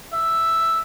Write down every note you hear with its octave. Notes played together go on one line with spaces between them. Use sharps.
E5